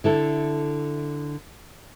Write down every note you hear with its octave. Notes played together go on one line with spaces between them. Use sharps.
D3 E4 A4